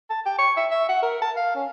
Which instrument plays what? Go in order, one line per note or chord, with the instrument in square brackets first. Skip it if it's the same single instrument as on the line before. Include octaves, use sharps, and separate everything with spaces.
[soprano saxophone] A5
G5
C#6
E5
E5
F#5
A#4
A5
F5
C#4